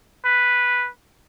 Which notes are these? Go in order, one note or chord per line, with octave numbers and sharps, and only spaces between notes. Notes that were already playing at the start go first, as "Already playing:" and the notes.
B4